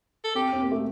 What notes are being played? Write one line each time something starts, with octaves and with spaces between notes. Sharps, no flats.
A4
C4 G4
C4
A#3
A3